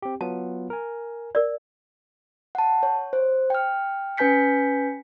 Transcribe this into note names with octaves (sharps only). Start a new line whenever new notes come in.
C4 G4
F#3 B3 F4 A5
A#4 G#5
A#4 D5
F#5 A5
C#5
C5
G5 F6
C#4 B4 G#5 G6 B6 C#7